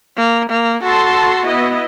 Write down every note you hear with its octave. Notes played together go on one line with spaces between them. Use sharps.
A#3
A#3
F#4 A4 A5 C6
B3 E4 D#5